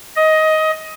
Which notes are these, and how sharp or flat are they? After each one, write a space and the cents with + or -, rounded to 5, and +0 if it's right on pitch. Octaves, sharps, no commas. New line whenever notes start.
D#5 +15